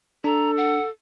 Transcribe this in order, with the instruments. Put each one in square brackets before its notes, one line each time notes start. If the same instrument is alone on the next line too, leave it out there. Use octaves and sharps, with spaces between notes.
[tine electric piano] D4 [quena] A4 [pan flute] A#5
[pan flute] F#5